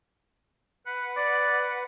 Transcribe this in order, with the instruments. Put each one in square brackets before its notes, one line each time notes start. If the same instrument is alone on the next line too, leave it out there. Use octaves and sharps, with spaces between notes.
[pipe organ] B4 F#5
[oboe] D5